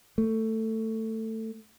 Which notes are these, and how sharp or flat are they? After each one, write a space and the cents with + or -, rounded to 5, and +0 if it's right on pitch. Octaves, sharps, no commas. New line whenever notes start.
A3 +15